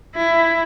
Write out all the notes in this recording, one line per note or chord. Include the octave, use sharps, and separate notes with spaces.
E4